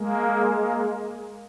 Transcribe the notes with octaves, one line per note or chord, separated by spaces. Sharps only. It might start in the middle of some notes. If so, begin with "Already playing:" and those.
Already playing: G#3 A#3
G#3 A#3